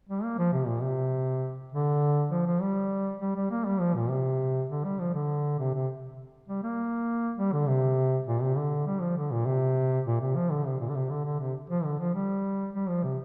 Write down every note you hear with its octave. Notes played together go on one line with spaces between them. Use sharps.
G3
A#3
F3
C3
A#2
C3
D3
F3
F3
G3
G3
G3
A#3
G3
F3
A#2
C3
D3
G3
F3
D3
C3
C3
G3
A#3
G3
D3
C3
A#2
C3
D3
G3
F3
D3
A#2
C3
A#2
C3
F3
D3
C3
A#2
D3
C3
D3
D3
C3
F3
D3
F3
G3
G3
F3
C3